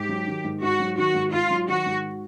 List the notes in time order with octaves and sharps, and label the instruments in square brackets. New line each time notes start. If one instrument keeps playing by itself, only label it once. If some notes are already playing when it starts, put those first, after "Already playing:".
Already playing: [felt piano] G#2 [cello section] G4
[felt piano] F#3
D#3
G#2
[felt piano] G#2 [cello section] F#4
[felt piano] F#3
[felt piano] D#3 [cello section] F#4
[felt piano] G#2
[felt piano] G#2 [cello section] F4
[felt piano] F#3
[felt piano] D#3 [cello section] F#4
[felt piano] G#2